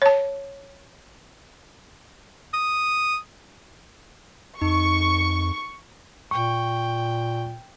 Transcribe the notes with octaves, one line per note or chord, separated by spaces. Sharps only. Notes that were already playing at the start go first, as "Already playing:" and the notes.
C#5 A5
D#6
F2 D#4 C#6
A#2 G5 C#6